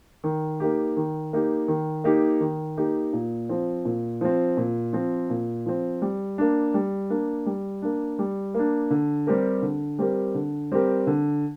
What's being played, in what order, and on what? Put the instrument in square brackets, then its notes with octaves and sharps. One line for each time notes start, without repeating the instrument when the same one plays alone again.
[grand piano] D#3
A#3 D#4 G4
D#3
A#3 D#4 G4
D#3
A#3 D#4 G4
D#3
A#3 D#4 G4
A#2
F3 C4
A#2
F3 C4
A#2
F3 C4
A#2
F3 C4
G3
A#3 D4
G3
A#3 D4
G3
A#3 D4
G3
A#3 D4
D3
G3 C4 G4 A#4
D3
G3 C4 G4 A#4
D3
G3 C4 G4 A#4
D3